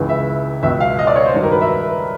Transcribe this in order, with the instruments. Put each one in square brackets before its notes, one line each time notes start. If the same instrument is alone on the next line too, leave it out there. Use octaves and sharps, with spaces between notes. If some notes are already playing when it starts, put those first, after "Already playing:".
Already playing: [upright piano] C#2 C#3 E3
E5
C#2 B2 F#3 E5
F5
D#5
D5
C#5
C5
G2 D#3 F#3
A#4
B4
E5